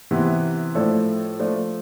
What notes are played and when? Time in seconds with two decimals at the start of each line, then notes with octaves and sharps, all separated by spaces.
0.11 C3 E3 B3
0.75 A2 F3 A3 D4 A4
1.39 F3 A3 D4